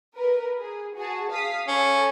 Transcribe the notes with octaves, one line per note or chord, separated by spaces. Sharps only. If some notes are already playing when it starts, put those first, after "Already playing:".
A#4 B4
G#4
F#4 G#4 A5
F5 D#6 B6
C#4 A4